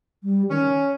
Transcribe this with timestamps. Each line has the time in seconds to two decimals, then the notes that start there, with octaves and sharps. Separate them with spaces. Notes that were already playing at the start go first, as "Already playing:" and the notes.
0.23 G3
0.50 D#3 C#4
0.69 C#5